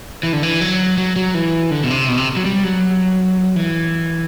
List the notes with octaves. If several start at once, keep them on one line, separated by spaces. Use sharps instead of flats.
E3
D3
E3
F#3
F#3
F#3
E3
D3
B2
C3
B2
C3
F#3
G3
F#3
E3